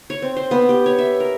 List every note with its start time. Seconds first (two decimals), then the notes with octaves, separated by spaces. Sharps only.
0.10 C#5
0.22 C4
0.37 C5
0.51 B3
0.69 G4
0.86 C#5
0.99 E5
1.20 A#4